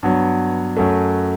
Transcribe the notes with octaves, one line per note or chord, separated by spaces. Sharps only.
G2 F#3 B3
F#2 F#3 A3